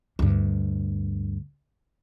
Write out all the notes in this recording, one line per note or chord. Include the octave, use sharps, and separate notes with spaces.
D2 G2